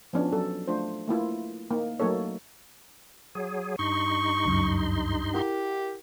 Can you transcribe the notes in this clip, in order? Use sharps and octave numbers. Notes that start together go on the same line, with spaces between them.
F3 B3 C#4 D4
F#3 A4
A3 D4 F4 C5
A3 A#3 E4 F4
A#3 D#4
F#3 A3 A#3 D#4 A4 C#5
F#3 G#4
G2 D#4 C6 C#6
C#2 F#2
E4 G4 A#4 F#5